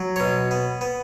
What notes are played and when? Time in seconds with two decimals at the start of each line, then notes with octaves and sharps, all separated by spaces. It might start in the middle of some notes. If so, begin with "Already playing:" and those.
Already playing: F#3
0.16 B2 C#5
0.51 B3
0.81 B3